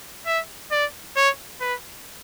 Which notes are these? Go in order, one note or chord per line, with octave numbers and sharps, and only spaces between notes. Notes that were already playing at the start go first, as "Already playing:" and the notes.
E5
D5
C#5
B4